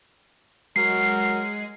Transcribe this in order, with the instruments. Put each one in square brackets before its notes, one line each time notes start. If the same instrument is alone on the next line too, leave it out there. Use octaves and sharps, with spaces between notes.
[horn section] F#3 A#4 [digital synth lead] G#3 [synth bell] C7